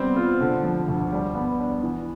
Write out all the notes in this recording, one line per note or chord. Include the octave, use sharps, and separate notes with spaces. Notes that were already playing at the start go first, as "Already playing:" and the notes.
Already playing: G3 B3 C4
F4
D3
F3
D2
G3
B3
D4
E3